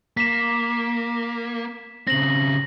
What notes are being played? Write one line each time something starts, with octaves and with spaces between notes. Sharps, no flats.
A#3 B6 E7
C#3 C4 A#6 F#7